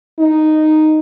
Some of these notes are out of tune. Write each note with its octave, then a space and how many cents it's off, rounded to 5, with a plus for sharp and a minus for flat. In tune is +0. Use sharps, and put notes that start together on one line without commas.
D#4 -5